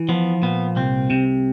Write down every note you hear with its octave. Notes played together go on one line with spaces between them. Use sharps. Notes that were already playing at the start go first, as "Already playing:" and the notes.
Already playing: E3
F3 B3
A#2 B3
C2 C4
C3